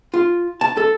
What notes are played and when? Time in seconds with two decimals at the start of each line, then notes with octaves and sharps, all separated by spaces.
0.14 F4
0.61 A5
0.77 A4